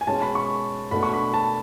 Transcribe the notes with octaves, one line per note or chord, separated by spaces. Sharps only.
G#5
B2 G#3 C#4 A5
B5
C#6
B2 A3 D4 B5
C#6
B5
A5